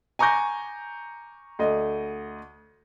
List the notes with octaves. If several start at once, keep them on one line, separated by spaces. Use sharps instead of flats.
G#5 A#5 C#6 D6 G6 A#6
D2 D#5